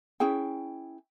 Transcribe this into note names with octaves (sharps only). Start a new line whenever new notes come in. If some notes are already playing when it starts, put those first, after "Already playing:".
C#4 E4 G#4 G5